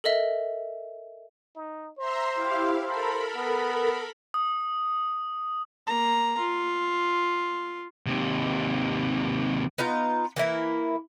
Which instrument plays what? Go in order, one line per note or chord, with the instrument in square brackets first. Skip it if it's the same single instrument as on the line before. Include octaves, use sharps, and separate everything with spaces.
[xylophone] A4 A#4 D#5 E5
[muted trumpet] D#4
[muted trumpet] C5 [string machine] E5 A#5 C6
[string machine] E4 G4 F5
[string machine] A4 A#4 B5 [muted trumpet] C5
[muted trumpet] B3
[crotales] D#6
[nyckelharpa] A#3 A#5
F4
[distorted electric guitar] D#2 C3
[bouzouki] B3 D#4 F4 A#5
E3 A#3 E4 A#4